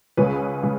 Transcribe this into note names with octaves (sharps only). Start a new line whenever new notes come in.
C#2 C#3 G#3 C#4 B4
C#3 G#3